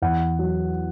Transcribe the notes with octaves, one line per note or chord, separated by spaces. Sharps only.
E2 F#5
F#3